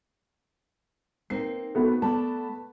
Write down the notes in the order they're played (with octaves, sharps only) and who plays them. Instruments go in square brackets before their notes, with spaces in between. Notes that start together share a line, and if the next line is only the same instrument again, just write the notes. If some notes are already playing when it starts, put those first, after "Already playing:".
[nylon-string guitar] A#3 C4 D#4 [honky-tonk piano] C7
[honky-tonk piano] A3 B3 F#4
[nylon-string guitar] A3 D5 [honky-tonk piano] B3 A5